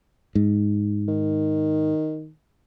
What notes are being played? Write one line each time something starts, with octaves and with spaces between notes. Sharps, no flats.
G#2
D#3